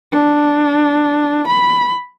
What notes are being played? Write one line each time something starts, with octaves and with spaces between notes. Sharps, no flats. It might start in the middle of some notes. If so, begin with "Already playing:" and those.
D4
B5